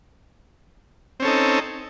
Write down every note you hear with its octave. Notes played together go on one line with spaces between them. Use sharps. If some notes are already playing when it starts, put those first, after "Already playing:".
C4 C#4 D#4 A4